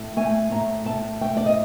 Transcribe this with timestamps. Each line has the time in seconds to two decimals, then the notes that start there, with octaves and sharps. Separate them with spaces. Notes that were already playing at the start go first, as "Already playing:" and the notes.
Already playing: A2
0.17 A3 G#5
0.52 A2 A#5
0.86 A2 A5
1.21 A3 G5
1.37 D5
1.46 D#5